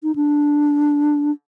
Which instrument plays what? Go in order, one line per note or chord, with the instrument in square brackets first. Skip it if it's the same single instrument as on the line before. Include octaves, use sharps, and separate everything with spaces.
[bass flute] D#4
D4